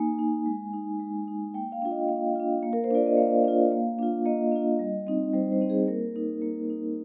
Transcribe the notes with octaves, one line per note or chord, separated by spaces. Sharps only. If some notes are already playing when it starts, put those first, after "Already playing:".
Already playing: A#3 D#4 G#5
D#4
G#3
D#4
G#3
D#4
A#3 G5
F5
D4 F4
D#5
A#3 F5
D4 F4
A#3
A#4
C5
D4 F4 D5
D#5
A#3 F5
D4 F4
A#3
D4 F4
A#3 D#5
D4 F4
G3
C4 D#4
G3 C5
C5
C4 D#4
G#4
A#3 A#4
D#4
A#3
D#4